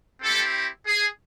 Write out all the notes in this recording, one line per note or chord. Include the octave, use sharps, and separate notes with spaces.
C4 E4 G4 A4
G#4